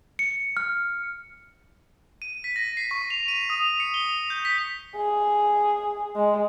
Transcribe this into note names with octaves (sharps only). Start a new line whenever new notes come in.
C#7
F6
D#7
B6
A#6
C7
C#6
F7
D#7
D#6
C#7
G7
G6
B6
G#4
G#3